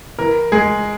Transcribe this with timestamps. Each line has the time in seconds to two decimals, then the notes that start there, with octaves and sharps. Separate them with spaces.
0.19 E3 A#4
0.52 G#3 G#4